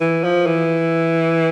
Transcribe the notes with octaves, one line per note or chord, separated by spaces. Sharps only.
E3
F3
E3